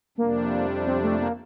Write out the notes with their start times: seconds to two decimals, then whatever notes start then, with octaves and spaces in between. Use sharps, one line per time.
0.17 F2 C3 G3 A#3 D4
0.86 C4
1.03 A3
1.21 A#3